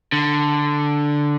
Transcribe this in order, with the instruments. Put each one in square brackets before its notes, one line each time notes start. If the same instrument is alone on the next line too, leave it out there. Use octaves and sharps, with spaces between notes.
[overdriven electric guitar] D3